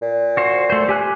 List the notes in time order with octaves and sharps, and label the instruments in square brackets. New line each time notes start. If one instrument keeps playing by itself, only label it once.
[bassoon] A#2
[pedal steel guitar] F#4 C5
A3 C5
G4 G#5 F#6